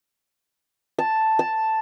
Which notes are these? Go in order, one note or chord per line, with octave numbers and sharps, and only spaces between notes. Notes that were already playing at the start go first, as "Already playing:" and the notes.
A5
A5